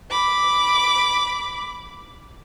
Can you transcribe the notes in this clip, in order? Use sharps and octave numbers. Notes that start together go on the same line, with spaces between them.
B5 D6